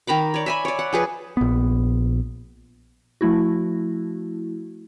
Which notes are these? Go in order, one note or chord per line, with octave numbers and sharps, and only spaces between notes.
D#3 A#5 B5 D6
C#5 D5
E5 G#5 B5
C#5 D5
F#5
F3 G#4 B4
A#1 B3
F3 A3 E4 F#4